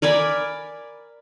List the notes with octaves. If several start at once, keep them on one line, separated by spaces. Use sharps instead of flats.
A#4 D5 G#5 B5